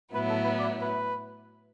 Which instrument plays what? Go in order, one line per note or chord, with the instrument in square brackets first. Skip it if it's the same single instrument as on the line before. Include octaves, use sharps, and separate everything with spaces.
[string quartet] A2 F#3 B3 E4 [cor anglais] B4
[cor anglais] A4
B4
D5
B4